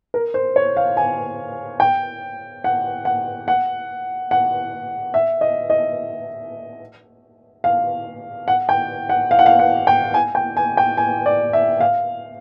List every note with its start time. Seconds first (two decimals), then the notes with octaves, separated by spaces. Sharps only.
0.14 A#4
0.34 C5
0.56 C#5
0.77 F5
0.97 G#5
1.80 G5
2.64 F#5
3.05 F#5
3.48 F#5
4.31 F#5
5.14 E5
5.41 D#5
5.70 D#5
7.64 F5
8.48 F#5
8.69 G5
9.09 F#5
9.31 F5
9.39 F#5
9.46 F5
9.59 F#5
9.87 G5
10.14 G#5
10.35 G5
10.57 G#5
10.77 G5
10.97 G#5
11.26 D5
11.53 E5
11.80 F5